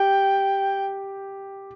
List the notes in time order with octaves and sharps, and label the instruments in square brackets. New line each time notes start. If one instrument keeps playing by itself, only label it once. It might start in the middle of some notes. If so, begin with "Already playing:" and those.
Already playing: [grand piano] G4 [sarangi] G5